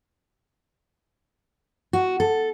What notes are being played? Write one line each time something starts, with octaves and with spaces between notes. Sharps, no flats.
F#4
A4